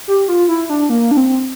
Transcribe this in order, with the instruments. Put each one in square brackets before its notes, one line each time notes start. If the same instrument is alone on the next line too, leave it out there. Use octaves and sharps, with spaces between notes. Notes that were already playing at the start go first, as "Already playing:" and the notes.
[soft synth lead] G4
F4
E4
D4
A#3
D4
C4